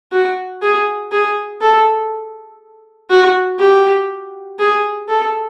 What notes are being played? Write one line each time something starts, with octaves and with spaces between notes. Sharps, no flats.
F#4
G#4
G#4
A4
F#4
G4
G#4
A4